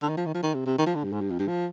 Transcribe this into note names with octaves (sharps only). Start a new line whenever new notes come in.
D3
D#3
F3
D#3
F3
D#3
C3
C3
D#3
F3
D3
G2
G#2
G2
F2
G2
F3